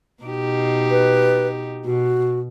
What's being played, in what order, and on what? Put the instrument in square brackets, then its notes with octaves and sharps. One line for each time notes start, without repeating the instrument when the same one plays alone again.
[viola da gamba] B2 D#4 G4
[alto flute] B4
[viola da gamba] B2 [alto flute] F#4